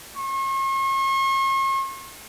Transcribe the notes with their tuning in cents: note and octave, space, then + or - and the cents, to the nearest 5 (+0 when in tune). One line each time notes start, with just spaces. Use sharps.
C#6 -45